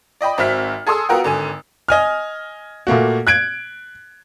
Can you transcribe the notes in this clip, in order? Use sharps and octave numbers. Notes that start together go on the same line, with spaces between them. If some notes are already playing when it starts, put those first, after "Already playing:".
D5 D#5 G5 B5
G#1 C4 F#4 E5 F6 B6
G#4 A4 G#5 C6 D#6 E6
B3 F4 F#4 A#4 F#5 G5
G#1 D3 G#5
D#5 G#5 F6
A#2 A3 A#3 F#4
F#6 G#6 D7